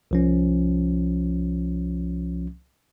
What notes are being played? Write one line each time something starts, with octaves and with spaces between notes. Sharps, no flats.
C2 F3 C#4